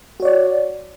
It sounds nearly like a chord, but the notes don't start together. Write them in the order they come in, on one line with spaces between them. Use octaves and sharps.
F#4 C#5 D5